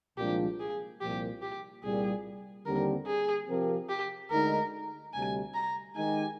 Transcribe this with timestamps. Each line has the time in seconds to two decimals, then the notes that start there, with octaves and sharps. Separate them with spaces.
0.17 C2 A#2 F3 G#3 D4 G4
0.60 G#4
1.00 C2 A#2 F3 G4
1.42 G4
1.83 C2 A#2 G3 G#4
2.66 D#2 D3 G3 C4 G4 A#4
3.07 G#4
3.48 C3 F3 C4 G4 A#4
3.89 G4
4.31 D2 D3 G#3 D#4 A#4
5.13 D2 C3 G3 G#5
5.54 A#5
5.96 D#3 G#3 D#4 G4 G#5